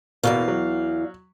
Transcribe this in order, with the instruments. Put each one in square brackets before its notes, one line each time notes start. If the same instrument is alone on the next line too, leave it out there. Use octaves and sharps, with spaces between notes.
[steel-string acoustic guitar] E2 G2 F5 [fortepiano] B2 A#3
[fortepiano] F#3